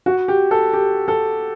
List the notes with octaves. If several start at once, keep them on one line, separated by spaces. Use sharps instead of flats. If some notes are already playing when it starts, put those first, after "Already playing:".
F#4
G4
A4
G4
A4